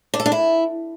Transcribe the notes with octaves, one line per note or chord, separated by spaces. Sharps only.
D4
A4
D4
E4